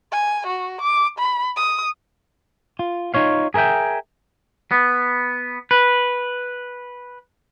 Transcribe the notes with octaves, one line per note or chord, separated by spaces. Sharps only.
G#5
F#4
D6
B5
D#6
F4
D#4 F4 C#5 F5
G#4 A#4 C5 E5 G5
B3
B4